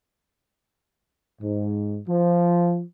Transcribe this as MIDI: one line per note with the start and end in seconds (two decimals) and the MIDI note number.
1.42 1.99 44
2.08 2.83 53